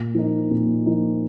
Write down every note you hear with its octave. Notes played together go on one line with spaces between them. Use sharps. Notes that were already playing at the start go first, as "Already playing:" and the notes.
Already playing: A#2
F3 A#3 D#4
A#2
F3 A#3 D#4